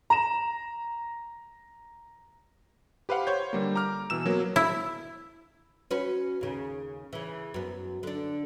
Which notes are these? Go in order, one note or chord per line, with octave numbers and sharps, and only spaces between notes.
A#5 E7
G4 B4 C5 F5 F#5
C5 C#5 G6
D3 G3 A#3
A#5 D6 F6
B2 E3 E6 E7
F#3 A#3 B3
E4
C#4 F#4 B4
D#2 C#3
C#3 E3
F#2 B3
D3 D4